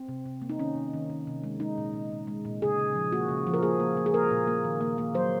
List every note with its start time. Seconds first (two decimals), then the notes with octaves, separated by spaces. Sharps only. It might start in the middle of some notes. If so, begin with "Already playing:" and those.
Already playing: C4
0.08 C3
0.26 C3
0.42 A#3
0.50 D#4
0.59 D#3 C#4
0.75 C3
0.93 D#3
1.10 D#3
1.27 C3
1.44 G#3
1.60 G#3 D#4
1.77 A#2
1.94 A#2
2.12 A#2
2.27 G#3
2.45 A#2
2.62 C#3 G#4
2.79 C#3
2.95 F3
3.12 A#3 F#4
3.29 C#3
3.47 F3
3.54 A#4
3.63 A#3 G#4
3.80 A#3
3.97 A#3
4.06 G#4
4.14 A#3 A#4
4.31 A#2
4.47 A#3
4.65 D#3
4.81 A#3
4.98 A#3
5.14 F#3 C5